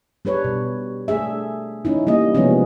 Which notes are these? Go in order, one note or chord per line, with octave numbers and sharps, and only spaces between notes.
G3 D4 B4 C#5
B2
A3 D4 G#4 E5
C#4 D#4 E4
G3 A#3 D#5
C3 F3 G3 G#3 B3 C#4